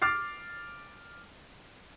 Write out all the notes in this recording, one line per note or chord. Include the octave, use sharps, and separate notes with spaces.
D6 F6 A6 C7